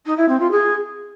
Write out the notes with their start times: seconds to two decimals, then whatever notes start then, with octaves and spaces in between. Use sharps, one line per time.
0.06 D#4
0.17 E4
0.28 C4
0.40 F4
0.51 G#4